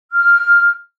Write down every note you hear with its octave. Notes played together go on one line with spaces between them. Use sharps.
F6